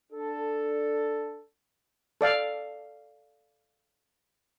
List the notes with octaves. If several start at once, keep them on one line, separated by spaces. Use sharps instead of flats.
D4 A4
A4 D5 F5